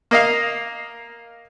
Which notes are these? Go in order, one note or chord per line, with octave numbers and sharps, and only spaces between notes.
A#3 D#5 F5